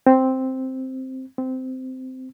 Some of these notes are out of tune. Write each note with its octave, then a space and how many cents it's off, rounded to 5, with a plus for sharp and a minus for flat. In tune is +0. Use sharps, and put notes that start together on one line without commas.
C4 +0
C4 -15